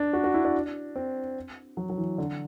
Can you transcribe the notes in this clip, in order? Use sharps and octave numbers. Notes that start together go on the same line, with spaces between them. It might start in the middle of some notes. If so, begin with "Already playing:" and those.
Already playing: D4
F#4
F#4
E4
D4
C4
F#3
F#3
E3
D3